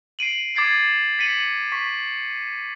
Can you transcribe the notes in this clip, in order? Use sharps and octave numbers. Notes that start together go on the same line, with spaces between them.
C7 D7 D#7 F#7
D6 G#6 A6 C7 D7 D#7
B6 C#7 D#7 F#7
C#6 B6